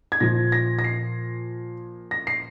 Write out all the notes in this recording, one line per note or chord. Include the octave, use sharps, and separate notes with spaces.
G#6
A#2 F3 A#6
A#6
A#6
C7
A#6
C7